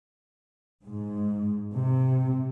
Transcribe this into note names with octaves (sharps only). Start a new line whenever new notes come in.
G#2
C3